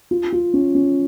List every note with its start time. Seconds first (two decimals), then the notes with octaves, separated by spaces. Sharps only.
0.11 F4
0.33 F4
0.54 C#4
0.75 C#4